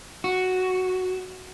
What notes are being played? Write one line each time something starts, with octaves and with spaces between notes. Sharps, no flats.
F#4